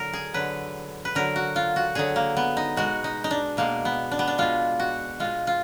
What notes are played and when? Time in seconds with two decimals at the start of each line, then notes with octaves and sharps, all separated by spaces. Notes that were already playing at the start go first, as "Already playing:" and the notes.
Already playing: D3 F#3 A#4
0.13 G#4
0.34 D3 F#3 B4
1.05 B4
1.15 D3 F#3 A#4
1.36 F#4
1.56 F4
1.76 F#4
1.95 D3 F#3 G#4
2.16 A#3
2.37 B3
2.57 D#4
2.76 B2 G#3 F#4
3.04 D#4
3.24 D#4
3.31 D4
3.57 B2 G#3 A#3
3.85 B3
4.11 D4
4.19 B3
4.28 D4
4.38 B2 G#3 F4
4.79 F#4
5.20 B2 G#3 F4
5.47 F4